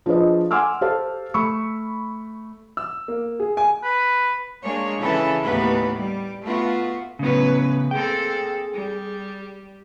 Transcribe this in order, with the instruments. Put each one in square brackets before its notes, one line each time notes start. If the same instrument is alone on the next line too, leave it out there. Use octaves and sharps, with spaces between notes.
[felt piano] F3 D4 G#4 B4 C5 D#5
F#5 G#5 C6 D6 E6 F6
G4 A4 C5 F5 A5
A3 B5 C#6 E6 C#7
[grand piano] E6
A#3
G#4
G#5
[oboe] B4
[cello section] G#3 A#3 D4 C#5
C#3 E3 C#4 E4 A4 B4
D#2 A2 E3 B3 B4
G3
A3 B3 F4 F#4
[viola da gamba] A2 F#3 B4 [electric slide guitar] C#3 B3 [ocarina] C#4
[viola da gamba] A#3 C4 A4 [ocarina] G#4 [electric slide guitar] G5
[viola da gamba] G3